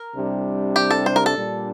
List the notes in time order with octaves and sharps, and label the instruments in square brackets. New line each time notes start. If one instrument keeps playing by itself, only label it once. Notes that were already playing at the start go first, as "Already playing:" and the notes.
Already playing: [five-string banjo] A#4
[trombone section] C2 C3 G3 D4
[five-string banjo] G4
A4
C5
A#4
A4
[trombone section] A#2 G3 D4